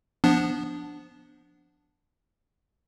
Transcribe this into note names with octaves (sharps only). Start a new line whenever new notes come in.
F3 B3 D4